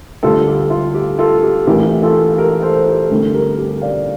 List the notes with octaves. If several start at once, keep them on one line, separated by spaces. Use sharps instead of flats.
D2 D3 G3 F4 A4
G4
F4
G4
F4 A4
G4
A#1 A2 E3 G4 A#4
F4 A4
G4 A#4
A4 C5
G4 A#4
A1 G2 D3 A3 C4
G4 A#4
G4
D5 F5